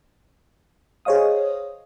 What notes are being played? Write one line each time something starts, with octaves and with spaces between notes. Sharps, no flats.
G#4 C5 C#5 D#5 F5 D#6